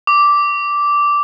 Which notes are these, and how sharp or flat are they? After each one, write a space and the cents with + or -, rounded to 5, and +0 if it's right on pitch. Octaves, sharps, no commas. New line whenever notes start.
D6 -10